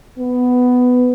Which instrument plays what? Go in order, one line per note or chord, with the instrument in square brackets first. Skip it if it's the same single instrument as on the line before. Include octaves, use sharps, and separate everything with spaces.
[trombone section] B3